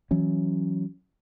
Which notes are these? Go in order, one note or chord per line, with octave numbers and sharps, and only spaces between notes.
E3 F#3 C#4